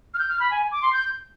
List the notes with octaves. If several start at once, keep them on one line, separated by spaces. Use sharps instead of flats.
F6
G6
F6
B5
G#5
D6
C6
G6